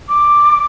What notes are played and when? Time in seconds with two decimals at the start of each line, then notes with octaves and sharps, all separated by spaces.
0.09 D6